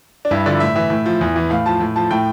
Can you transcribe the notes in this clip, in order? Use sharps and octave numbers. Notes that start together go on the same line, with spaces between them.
D4
G2 E4
D3 F3 D5
A2 E5
E3 E5
A2
F3
E2
E3
A2 F5
F3 A5
A2
F3 A5
A2 G5